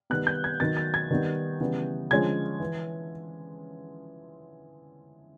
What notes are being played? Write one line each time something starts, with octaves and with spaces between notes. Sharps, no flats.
D#3 G3 B3 F#6
G6
G#6
D#3 F#3 B3 A6
A6
G#6
D#3 G3 B3
C#3 E3 G3 B3
D3 F3 G#3 C#4 G#6
E3